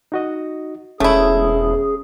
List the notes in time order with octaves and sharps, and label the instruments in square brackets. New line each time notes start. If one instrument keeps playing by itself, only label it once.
[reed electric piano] D#4 F#4 D#5
[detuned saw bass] E1 [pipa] A3 E4 [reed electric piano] C#4 [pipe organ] G#4